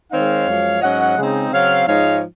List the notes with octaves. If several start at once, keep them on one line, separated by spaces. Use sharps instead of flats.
D#3 G#3 C4 D#4 C#5 F5
F#2 F3 G#3
G#2 F#3 C#4 D#5 F#5
C#3 G#3 C4 D#4
C#3 F#3 C4 C#5 F5
G#2 F3 G#3 D#4 C#5 F5